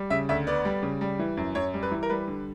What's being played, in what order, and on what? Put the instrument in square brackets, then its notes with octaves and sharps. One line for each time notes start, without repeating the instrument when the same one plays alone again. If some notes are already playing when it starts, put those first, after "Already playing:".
Already playing: [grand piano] G3
C#3 E5
D2 E5
B3 D5
G3
C#3
G3
E3
F#2
F#2 C#5
G3
B4
E3
A#4
G3 B4
D3